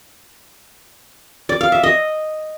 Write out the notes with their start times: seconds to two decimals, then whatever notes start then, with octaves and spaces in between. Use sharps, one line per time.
1.49 D5
1.61 F5
1.72 E5
1.83 D#5